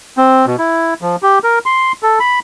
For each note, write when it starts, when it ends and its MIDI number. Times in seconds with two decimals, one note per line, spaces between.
0.17 0.46 60
0.46 0.56 47
0.58 0.94 64
1.02 1.16 53
1.23 1.39 67
1.44 1.59 70
1.66 1.92 84
2.03 2.19 69
2.20 2.39 83